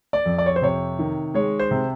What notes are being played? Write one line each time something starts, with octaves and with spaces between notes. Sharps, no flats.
D5
F2
D5
C#5
C5
C3 C#5
D#3
G#3 C#5
C5
C3